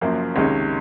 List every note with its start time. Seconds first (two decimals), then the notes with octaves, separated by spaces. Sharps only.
0.01 F#1 F#2 F3 A#3
0.36 C#2 C3 D#3 G#3 C#4